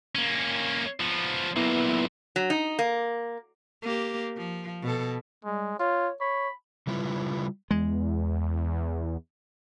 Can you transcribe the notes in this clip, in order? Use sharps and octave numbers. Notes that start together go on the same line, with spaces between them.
A#3 C#4
F3 B3
B1 A#2 B3 E4
F#3
D#4
A#3
A#3 G4
F3
B2 A4
G3 G#3
F4 C#5
C#5 B5
C#3 G3 E4 F4 B4
E2 G#3